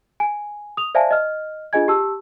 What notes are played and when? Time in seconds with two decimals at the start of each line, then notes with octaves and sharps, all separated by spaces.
0.20 G#5
0.77 D#6 F7
0.95 C5 D5 E5 F5 G#5 A5
1.11 D#5 F6
1.73 D4 F4 G#4 D#5 G#5 G#6
1.88 G4 A5 E6